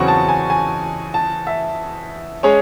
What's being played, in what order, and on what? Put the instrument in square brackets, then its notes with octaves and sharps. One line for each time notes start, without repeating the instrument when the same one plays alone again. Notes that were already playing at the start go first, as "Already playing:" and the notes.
Already playing: [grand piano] E2 C#3 F#3 C4 F#4 [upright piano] C#6
[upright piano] A5
G#5
G#5
A5
E5
[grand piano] G#3 C#4 G#4 C#5